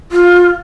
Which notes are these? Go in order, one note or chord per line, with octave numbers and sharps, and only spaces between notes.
F4